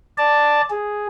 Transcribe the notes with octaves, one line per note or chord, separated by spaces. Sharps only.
D5 A5
G#4